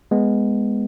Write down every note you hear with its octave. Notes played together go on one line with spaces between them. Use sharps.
G#3 B3